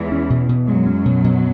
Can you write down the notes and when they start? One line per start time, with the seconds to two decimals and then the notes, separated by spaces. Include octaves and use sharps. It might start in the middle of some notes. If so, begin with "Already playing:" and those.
Already playing: E2 E3 G#3
0.12 C#4
0.30 B2
0.49 B2
0.67 F#2 F#3 G#3
0.86 C#4
1.05 B2
1.24 B2